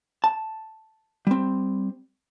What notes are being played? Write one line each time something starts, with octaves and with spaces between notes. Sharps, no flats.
A5
G3 C4